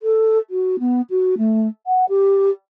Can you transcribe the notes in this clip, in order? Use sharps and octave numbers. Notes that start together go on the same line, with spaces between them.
A4
F#4
B3
F#4
A3
F#5
G4